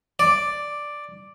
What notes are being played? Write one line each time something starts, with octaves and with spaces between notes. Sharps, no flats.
D5